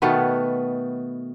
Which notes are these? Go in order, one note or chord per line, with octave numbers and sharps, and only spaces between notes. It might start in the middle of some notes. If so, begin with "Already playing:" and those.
B2 D#3 A3 B3